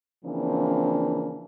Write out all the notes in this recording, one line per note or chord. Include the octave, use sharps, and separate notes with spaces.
C#3 E3 F3 A#3 C4 D4